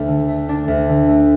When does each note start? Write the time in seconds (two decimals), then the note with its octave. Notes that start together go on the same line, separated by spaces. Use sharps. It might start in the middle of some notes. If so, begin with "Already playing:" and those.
Already playing: D2 A3 D4
0.08 D3
0.28 A3
0.49 D4
0.68 D2
0.89 D3
1.08 A3